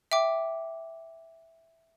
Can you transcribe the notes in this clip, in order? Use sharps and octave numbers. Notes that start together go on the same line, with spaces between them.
E5 G5 D6